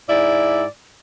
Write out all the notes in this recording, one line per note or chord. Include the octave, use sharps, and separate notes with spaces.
G#2 E4 D5